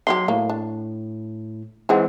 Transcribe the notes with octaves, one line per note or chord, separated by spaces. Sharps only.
F#3 D#4 F4 G4 C6
A2 A3 A#3
D4
E3 G#3 C4 D#4 G#4 F#5